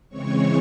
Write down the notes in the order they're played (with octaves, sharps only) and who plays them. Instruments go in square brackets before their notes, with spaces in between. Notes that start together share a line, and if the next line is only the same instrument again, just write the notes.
[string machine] C#3 E3 G#3 C4 C#5 C#6